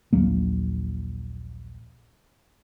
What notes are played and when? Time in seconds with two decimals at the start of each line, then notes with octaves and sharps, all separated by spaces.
0.13 A#1 D#2 F#3 A#3